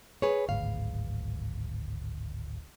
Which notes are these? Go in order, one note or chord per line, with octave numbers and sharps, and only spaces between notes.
G#4 B4 C#5
D1 G#1 D2 F5